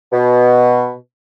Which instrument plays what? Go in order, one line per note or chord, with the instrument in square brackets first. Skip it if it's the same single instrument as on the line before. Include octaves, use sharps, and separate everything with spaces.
[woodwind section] B2